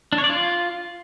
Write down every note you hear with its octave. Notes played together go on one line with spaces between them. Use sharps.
D4
C#5
D5
F4